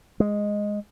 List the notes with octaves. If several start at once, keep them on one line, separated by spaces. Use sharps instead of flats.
G#3